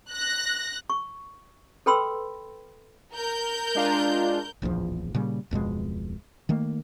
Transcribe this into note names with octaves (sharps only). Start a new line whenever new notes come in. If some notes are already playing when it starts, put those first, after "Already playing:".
F#6 A#6
C#6
A4 B4 G5 B5 C6 E6
A#4 G6
G#3 D4 F4
D1 A#1 E2 F3
A#2 C#3 G3
D1 F2 B2 G#3
D#3 A3 A#3